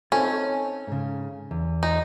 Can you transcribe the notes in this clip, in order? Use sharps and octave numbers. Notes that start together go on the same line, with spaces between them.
C4 C#4 D#4 A4
G#2 C#3
E2
D#4